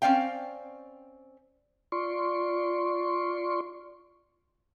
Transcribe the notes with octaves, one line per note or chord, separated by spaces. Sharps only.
C4 C#4 D5 F5 G5
F4 D5 C6 C#6